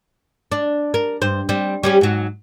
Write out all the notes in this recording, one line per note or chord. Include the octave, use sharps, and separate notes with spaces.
D4
A#4
G2 C5
G3 C4
G3 C#4 G4
G#2 F#3